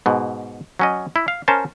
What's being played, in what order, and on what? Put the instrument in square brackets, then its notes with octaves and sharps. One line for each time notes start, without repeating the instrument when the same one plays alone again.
[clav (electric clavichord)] G#2 B2
F#3 C#4 D#5
E4
F5
C#4 A#4 C5 A5